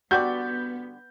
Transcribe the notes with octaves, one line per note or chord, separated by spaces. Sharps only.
D3 G3 B3 F#4 D5 G6